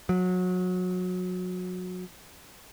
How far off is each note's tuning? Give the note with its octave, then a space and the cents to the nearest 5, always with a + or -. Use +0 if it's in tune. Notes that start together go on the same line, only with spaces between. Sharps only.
F#3 -25